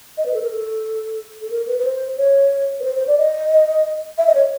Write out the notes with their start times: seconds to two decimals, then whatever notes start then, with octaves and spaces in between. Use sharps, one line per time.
0.18 D#5
0.26 B4
0.34 A4
0.42 A#4
0.51 A4
1.41 A4
1.50 A#4
1.67 B4
1.79 B4
1.85 C5
2.18 C#5
2.80 B4
2.84 C5
2.96 C5
3.07 D5
3.18 D#5
4.18 E5
4.27 D#5
4.35 C#5